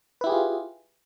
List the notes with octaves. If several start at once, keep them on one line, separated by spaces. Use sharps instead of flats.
E4 F4 G4 G#4 B4